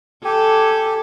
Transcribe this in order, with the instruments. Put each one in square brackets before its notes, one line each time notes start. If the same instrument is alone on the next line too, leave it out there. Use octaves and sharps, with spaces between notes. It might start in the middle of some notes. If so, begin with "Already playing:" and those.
[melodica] G4 G#5 [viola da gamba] A4